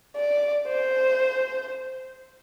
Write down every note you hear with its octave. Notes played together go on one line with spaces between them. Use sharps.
D5
C5